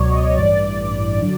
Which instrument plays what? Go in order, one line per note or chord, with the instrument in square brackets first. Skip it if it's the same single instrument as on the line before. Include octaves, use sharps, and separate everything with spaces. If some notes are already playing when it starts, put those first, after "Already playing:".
Already playing: [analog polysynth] C#2 B2 F#3 C#5 D5
D#5
A1 G2 E3 D5
D3 F#3